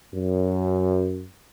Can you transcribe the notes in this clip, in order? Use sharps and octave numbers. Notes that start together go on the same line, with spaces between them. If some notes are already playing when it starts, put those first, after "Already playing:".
F#2